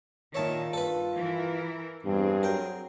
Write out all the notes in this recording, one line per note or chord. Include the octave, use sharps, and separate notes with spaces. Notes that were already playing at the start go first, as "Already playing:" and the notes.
A#2 D#3 F4 C#5 E5 A5
G2 A4 B4
E3 A#4
E2 G2 C4 G#4
F#3 A#4 G5